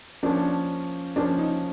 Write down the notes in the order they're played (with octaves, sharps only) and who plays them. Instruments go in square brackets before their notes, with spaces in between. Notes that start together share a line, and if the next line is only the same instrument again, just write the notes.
[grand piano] F3 A#3 C#4 [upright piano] D4
[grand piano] F3 A#3 C#4 [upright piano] D4
[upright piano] D#4